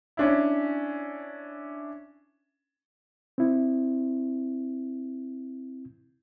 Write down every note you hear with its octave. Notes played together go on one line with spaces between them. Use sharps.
C#4 D4 E4
C4 E4